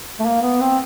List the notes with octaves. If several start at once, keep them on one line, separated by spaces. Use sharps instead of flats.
A3
A#3
B3
C4